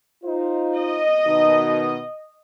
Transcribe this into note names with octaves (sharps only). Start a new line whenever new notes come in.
D#4 F4 C5
D#5
B2 D#3 D#4